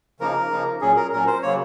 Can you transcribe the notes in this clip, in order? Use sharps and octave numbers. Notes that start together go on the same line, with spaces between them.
C#3 F3 A#3 D#4 A#4
C#3 F3 A#3 D#4
A#2 F#3 C#4 G#4
A#4
A#2 F#3 C#4 A#4
C5
C#3 F#3 A#3 C#5